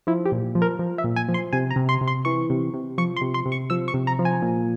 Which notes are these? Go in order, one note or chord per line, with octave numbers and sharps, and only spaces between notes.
F3 E4
G4
A#2
F3
A#4
F3
E5
A#2
G#5
F3
C6
C3 G#5
A#5
C3
C6
C3
C6
E3 C#6
C3
C3
F3 C#6
C6
C3
C6
C3
C#6
F3 E6
C#6
C3
A#5
F3
G#5
A#2